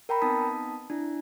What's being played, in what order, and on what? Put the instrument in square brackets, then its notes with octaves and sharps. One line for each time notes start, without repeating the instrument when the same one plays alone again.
[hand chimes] A#4 G5 A#5 B5
B3 C4 D#4 A5 D#6 B6
D4 E4